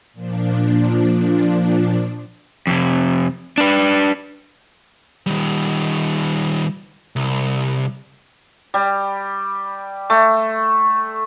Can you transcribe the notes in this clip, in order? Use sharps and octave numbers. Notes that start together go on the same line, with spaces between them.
A#2 F3 D4
F2 C3
D4 B4
D#3 G3
C2
G3
A3